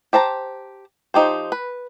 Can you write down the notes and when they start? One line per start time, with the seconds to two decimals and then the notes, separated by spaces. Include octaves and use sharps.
0.13 G4 C5 A5 A#5
1.14 F3 D#4 G4 C5
1.52 B4